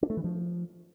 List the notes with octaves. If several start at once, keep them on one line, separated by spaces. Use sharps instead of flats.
D4
A3
E3
F3